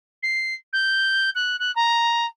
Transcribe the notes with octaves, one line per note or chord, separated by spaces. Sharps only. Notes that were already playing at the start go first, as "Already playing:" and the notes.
C7
G6
F#6
F#6
A#5